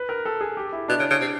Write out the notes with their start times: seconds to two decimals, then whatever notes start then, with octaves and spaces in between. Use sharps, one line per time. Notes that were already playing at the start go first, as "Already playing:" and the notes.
Already playing: B4
0.09 A#4
0.25 A4
0.41 G#4
0.57 G4
0.72 E4
0.88 B2 D4
1.00 C#3
1.10 C#3
1.21 C3